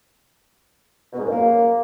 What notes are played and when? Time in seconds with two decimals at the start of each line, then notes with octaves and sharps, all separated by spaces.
1.12 B2
1.18 G#2
1.24 F#2
1.30 A#3